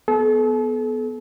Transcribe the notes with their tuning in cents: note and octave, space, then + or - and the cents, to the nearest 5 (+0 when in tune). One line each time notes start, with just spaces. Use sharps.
B3 +0 A4 -40